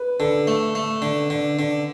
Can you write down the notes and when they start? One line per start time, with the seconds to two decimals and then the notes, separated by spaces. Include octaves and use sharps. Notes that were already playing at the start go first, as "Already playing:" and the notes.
Already playing: B4
0.20 D3 A4
0.47 A3
0.75 A3
1.02 D3
1.30 D3
1.59 D3